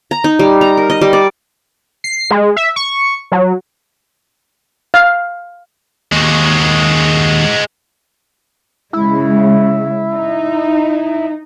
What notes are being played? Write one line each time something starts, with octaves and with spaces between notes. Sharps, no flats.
A#5
D#4
G3
A#5
A#4
D#5
G3
D5
C7
G#3
E5
C#6
F#3
F5
D#2 G#3 F#4
C#3 G#3 E4
D#4